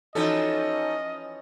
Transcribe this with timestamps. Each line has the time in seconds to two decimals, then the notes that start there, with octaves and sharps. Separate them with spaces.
0.15 E3 F3 C#4 D#4 F#4 A4 D#5